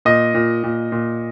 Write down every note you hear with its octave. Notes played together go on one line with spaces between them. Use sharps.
A#2 D#5
A#2
A#2
A#2